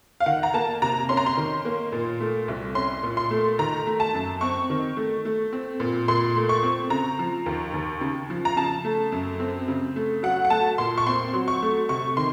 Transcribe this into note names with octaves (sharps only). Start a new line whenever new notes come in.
F5
D#3 F#5
A#5
A#3 A5
C3 A#5
C#4 C6
A#5
C6
D#3
A#3
A#2
A3
C2
C#4 C6
A#2
C6
A3
D#3 A#5
A3
A5
F#2
C4 C#6
D#3
A3
A3
C4
A#2
A#2 C6
A3
C#6
C4
C#3 A#5
F3
D#2
D#2
C#3
F3
A#5
C#3 A5
A3
F#2
C4
C#3
A3
F#3 F#5
F#5
A3 A5
A#2 C6
C#6
C4 C6
F#3
C#6
A3
C3 C#6
D#3 C6